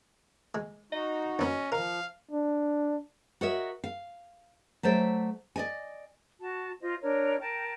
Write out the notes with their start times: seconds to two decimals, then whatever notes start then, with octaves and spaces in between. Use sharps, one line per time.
0.55 G#3
0.92 D#4 F#4 D#5
1.39 F#2 B3 C#4
1.72 F3 A#4 F5
2.31 D4
3.41 F#4 A#4 C#5 D#5 E5
3.84 F5
4.83 F#3 A3 C5 D5 E5
5.56 D5 D#5 G#5
6.40 F#4 A5
6.81 F4 C5 D#5
7.02 D4 A#4 C#5
7.39 A#4 G5 A5